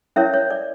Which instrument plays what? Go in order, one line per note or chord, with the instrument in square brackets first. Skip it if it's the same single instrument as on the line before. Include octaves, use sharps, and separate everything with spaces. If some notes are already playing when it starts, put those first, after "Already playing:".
[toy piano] C#4 E4 A#4 C#5 E5
C#5
D5